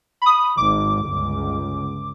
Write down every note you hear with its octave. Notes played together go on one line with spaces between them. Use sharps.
B5 D#6
G#1 D6
G1 C#2